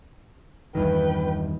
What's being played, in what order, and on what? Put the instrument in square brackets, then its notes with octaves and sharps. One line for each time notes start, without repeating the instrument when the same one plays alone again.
[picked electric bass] E2 G2 D#3 [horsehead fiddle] B4 G5